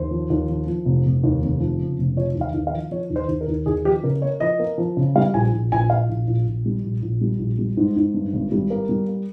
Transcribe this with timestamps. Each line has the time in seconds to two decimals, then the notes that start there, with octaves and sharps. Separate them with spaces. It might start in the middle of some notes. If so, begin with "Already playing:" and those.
Already playing: D#2 C5
0.11 F3
0.30 D#2
0.49 F3
0.67 F3
0.85 F1
1.05 F1
1.23 D#2
1.42 F1
1.60 F3
1.80 C#3
1.98 F1
2.16 F3 C#5
2.35 D#2
2.41 F5
2.54 D#2
2.67 F5
2.73 F3
2.91 F3 C#5
3.10 D#2
3.16 C5
3.28 D#2
3.41 A#4
3.48 D#2
3.66 D#2 G#4
3.85 F3 G4
4.03 C#3 A#4
4.22 A#3 C#5
4.40 F3 D#5
4.59 A#3
4.78 F3
4.97 C#3
5.16 G3 F5
5.34 A#1 G#5
5.53 A#1
5.72 A#1 G#5
5.90 A#1 F5
6.09 A#1
6.27 A#1
6.47 A#1
6.66 G3
6.84 A#1
7.02 A#1
7.21 G3
7.39 A#1
7.59 G3
7.77 G#2
7.96 G#2
8.14 G2
8.33 G#1
8.52 G3
8.70 A#3
8.89 G3
9.08 A#3